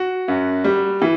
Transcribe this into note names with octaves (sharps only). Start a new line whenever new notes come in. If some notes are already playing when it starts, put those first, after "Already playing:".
Already playing: F#4
F#2
G3
E3